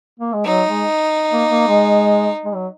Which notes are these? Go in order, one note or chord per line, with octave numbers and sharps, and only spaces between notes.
A#3
G#3
F#3 D#4
G#3
A#3
A#3
G#3
G#3
F#3